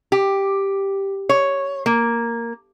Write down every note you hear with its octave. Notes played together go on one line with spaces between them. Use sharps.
G4
C#5
A#3